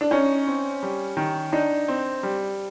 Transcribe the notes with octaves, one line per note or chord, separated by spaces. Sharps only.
D4
C#4 D#4
C4
G3
D#3
D4 D#4
C4
G3